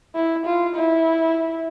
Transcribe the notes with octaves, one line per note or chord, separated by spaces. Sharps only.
E4
F4
E4